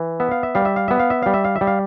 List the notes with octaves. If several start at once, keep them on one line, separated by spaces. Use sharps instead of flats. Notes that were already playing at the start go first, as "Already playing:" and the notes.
Already playing: E3
B3 E5
F5
E5
G3 F5
E5
F5
B3 E5
F5
E5
G3 F5
E5
F5
E5
G3
F5